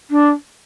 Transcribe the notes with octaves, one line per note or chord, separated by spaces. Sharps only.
D4